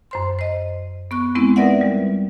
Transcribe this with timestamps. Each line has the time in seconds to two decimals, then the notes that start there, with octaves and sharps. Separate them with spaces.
0.11 F#2 C5 C6
0.39 C5 D#5
1.11 B3 C#6 F#6
1.35 G#3 B3 C4 E4
1.56 D#4 A#4 B4 D5 E5 F#5
1.81 G3